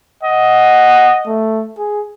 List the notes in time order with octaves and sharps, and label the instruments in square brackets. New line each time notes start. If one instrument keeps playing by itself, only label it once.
[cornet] D#5 [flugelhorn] F#5
[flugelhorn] A3
G#4